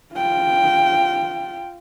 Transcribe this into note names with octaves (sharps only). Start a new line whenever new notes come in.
F4 G5